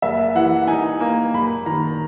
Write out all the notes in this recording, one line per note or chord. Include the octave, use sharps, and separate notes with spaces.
F#1 E5
E3 F#5
D#4 G#5
A#3
F#1 B5
D#3 A#5